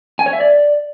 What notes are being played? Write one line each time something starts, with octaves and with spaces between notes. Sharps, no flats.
G#5
C#5
E5
D5